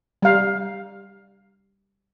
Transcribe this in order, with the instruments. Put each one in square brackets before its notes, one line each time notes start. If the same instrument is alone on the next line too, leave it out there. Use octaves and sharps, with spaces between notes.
[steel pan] G3 F5